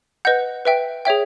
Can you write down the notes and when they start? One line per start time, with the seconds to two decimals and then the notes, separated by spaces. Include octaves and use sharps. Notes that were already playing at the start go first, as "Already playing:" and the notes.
0.25 B4 D#5 F#5 G6
0.65 B4 E5 G5
1.05 G#4 C#5 E5 G5